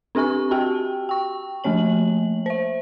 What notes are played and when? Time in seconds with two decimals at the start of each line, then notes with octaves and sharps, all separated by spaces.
0.15 C4 D4 G4 G#5 C#6
0.51 F#4 G4 G5 A5
1.09 G5 C#6
1.64 F3 A3 A#3 C#5 F#7
2.46 C5 E5